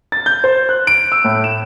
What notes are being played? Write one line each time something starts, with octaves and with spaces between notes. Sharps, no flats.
A6
G6
C5
F#6
D7
E6
A2
E7